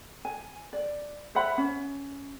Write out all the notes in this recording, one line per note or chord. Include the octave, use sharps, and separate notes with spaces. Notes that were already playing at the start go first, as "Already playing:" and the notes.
G#5
D5
C5 E5 F#5 B5
C#4